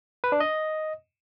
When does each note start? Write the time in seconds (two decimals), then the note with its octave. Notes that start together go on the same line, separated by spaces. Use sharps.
0.24 B4
0.32 D4
0.40 D#5